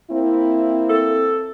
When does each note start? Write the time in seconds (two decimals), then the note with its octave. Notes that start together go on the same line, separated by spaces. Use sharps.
0.11 A#3 C4 E4
0.89 A4